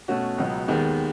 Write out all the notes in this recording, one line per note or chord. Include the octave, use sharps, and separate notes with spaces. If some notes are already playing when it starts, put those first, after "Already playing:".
B2 A3 C#4 F#4
C#2 B2 F#3 B3
D#2 D#3 G#3 B3